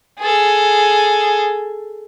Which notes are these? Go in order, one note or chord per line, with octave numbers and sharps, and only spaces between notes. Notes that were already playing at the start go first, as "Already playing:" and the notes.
G#4 A4